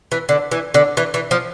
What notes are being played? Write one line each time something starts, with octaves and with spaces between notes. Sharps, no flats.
E3
D3
E3
D3
E3
E3
F3